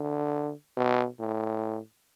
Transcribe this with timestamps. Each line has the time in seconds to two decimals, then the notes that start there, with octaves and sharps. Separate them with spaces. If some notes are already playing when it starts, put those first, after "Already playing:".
Already playing: D3
0.77 B2
1.19 A2